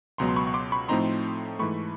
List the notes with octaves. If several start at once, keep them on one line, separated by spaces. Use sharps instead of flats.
C#2 B2 F#3 B3 A#5 C6
C6
B5 C#6
C#6
C6 D6
B5 C#6
A2 F3 A3 C4 D#4 A#5 C6
G#2 E3 A3 B5 C#6